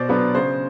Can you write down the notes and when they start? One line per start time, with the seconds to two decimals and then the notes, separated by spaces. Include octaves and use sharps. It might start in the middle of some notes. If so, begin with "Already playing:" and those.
Already playing: B2 C5 D5
0.09 F#3 B3 D4 B4
0.35 C#3 C5